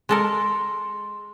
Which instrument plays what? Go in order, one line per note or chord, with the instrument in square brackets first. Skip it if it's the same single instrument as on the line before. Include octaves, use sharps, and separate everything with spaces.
[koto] G#3 A4 A#4 [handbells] C6